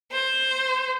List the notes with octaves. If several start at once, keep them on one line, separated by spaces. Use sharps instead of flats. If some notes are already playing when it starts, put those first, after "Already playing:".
C5